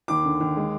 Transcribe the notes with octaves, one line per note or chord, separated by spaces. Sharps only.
D#2 D6
D3
D#2
G#3